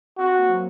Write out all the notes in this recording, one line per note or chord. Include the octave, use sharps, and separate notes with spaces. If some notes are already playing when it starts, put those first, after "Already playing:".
C4 F#4
A#3
F#3